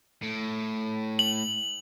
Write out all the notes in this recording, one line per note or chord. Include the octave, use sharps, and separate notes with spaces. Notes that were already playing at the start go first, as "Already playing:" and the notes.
A2
F#7